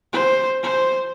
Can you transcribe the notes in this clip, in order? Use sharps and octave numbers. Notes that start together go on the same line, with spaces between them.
C5
C5